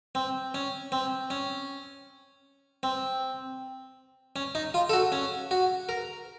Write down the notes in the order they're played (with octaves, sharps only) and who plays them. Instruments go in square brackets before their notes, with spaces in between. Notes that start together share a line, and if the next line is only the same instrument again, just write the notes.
[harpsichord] C4
C#4
C4
C#4
C4
C#4
D#4
F4
A4
F#4
C#4
F#4
A#4